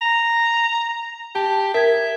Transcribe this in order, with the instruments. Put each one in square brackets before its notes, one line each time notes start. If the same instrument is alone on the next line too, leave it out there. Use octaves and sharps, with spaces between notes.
[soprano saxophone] A#5
[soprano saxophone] G4 [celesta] A5
[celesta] A#4 G#6 [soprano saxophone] E5